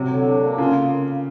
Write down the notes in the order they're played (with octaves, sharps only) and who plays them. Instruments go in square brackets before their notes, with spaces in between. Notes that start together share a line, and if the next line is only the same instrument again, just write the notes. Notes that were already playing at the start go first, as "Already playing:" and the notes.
Already playing: [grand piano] C3 [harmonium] F#3
[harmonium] D3
D4
A#3
[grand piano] C#3 [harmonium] F4